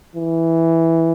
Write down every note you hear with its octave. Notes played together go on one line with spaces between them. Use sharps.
E3